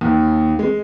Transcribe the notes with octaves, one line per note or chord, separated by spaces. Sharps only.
D#2
G#3